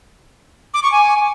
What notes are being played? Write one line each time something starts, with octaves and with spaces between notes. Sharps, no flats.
D6
C#6
G#5